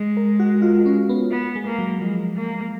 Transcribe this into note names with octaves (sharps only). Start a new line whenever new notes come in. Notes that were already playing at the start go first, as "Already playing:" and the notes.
Already playing: G#3
A#4
F#4
F4
C#4
B3
B3
G#3
A#3
F#3
F3 G#3
A#3